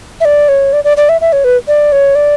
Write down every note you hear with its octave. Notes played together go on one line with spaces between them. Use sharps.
E5
D5
C#5
D5
D5
D5
E5
E5
C#5
B4
D5
C#5
D5